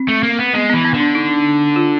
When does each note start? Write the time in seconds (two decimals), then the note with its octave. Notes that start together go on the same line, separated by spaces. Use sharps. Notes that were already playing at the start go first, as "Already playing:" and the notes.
Already playing: C4
0.08 A3
0.23 A#3
0.39 B3
0.54 G#3 B3
0.69 E3 B3
0.85 B3
0.94 D3
1.00 D4
1.15 D#4
1.76 F4